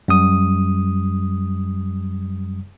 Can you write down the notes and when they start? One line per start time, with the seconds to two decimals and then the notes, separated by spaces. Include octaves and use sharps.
0.08 F#2 G3 D#6